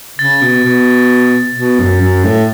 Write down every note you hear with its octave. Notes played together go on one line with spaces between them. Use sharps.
C#3 A6
B2
B2
B2
F#2
F#2
A2